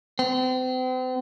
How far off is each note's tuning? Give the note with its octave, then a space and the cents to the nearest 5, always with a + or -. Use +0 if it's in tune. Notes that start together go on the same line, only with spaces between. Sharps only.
C4 -40